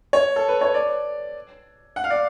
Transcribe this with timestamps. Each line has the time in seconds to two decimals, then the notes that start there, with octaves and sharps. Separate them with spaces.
0.13 C#5
0.36 A4
0.48 B4
0.61 C#5
0.74 D5
1.96 F#5
2.04 F5
2.10 D5